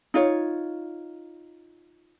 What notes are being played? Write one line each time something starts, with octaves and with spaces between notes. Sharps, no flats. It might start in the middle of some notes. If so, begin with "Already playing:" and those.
D#4 F4 C#5